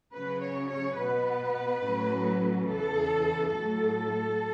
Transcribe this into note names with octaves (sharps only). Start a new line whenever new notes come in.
C#3 F#3 C#4 B4
C#5
C#5
B2 B3 B4
A2 F#3 C#4
E2 C#3 E3 A4
A2 F#3 A3 A4